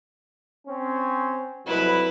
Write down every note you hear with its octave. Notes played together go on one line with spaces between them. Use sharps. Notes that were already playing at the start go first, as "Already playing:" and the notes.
C4 C#4
C2 F2 F#3 E4 B4